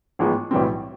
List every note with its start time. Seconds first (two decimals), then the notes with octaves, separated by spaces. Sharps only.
0.19 A1 G#2 F3 G#3 B3
0.51 B1 A2 E3 G3 C4